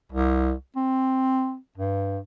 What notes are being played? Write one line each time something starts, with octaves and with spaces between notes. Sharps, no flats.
C2
C4
G2